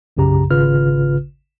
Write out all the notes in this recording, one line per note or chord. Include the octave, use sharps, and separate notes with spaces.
B1 F#2 C#3 G4 A#5
G#1 C#3 F4 B4 F6